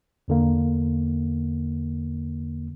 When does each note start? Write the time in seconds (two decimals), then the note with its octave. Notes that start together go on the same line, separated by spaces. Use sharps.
0.28 E2 D3 A#3